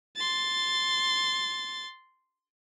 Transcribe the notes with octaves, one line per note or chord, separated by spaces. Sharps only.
C6 A6